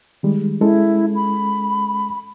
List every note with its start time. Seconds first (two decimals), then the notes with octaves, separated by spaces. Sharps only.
0.23 D#3 G3 G#3
0.61 G#3 C#4 E4 A4
1.15 B5